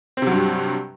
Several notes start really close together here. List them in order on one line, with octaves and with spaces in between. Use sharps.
C4 C3 F#3 G2